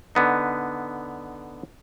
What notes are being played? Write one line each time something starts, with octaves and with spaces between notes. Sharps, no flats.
D3 B3 D#4